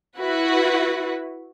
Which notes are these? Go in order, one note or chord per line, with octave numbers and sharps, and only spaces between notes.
E4 F#4 B4